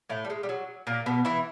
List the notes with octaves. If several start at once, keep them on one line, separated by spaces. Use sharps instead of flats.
A2 A3
G3
G#3
G3
F#3
A#2 A#3
B2 B3
E3 E4